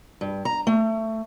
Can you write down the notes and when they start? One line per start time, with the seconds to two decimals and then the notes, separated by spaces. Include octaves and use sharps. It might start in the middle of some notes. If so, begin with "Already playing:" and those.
0.21 G2
0.45 A#5
0.67 A3